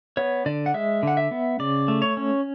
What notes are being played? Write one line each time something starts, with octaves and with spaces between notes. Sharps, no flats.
B3 C#5
D3 D5
F#5
G#3 E5
D3 F#5
E5
B3
C#3 D5
A3
C#5
C#4